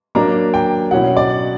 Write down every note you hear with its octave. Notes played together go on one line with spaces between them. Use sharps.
F#3 A#3 D4 A#5
G5
B2 F#3 C#4 E4 F#5
D5